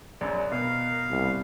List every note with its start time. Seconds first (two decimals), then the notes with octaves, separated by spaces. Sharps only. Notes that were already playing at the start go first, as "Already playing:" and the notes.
0.21 A#1 F#2
0.52 B2 A#4 F5
1.10 C2